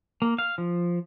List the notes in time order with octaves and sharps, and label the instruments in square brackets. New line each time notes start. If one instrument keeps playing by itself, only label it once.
[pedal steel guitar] A#3
F5
F3